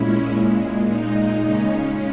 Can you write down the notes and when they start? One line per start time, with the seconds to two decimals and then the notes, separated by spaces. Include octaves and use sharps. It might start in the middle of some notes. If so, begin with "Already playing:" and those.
Already playing: A#2 G#3 C#4 E4
0.27 A#2 G#3
0.86 A#2 G#3 D#4
1.45 C#3 G#3 C#4